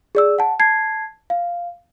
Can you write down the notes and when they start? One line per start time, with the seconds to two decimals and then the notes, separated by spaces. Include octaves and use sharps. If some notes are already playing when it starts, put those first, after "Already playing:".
0.15 G#4 D5 E6
0.38 F#5 A5
0.60 A5 G#6 C7
1.30 F5